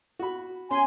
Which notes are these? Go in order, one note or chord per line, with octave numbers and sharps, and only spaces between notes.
F#4 B5
C#4 G#5 C6